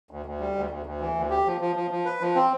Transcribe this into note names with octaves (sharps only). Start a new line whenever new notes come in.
D2
D2
G3
D2
D2
D2
E3
D2
G4
F3
F3
F3
F3
B4
F3
C4